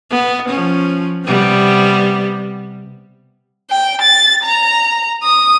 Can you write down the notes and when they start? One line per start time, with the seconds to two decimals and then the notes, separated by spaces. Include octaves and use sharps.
0.11 B3
0.49 F3 C#4
1.25 C3 G3 B3
3.71 G5
4.01 A6
4.44 A#5
5.23 D#6